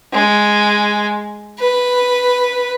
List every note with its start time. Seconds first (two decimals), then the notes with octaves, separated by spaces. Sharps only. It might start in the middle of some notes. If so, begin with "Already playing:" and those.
0.13 G#3
1.60 B4